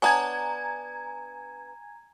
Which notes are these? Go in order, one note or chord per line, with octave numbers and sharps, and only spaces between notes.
B3 D4 C#5 G#5 A#5 G#6